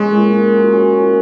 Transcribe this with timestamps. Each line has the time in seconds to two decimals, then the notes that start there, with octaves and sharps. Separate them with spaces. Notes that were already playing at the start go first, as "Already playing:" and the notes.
Already playing: G#3 C#4
0.11 A#2
0.32 A#3
0.52 F#3
0.73 C#4
0.93 A#2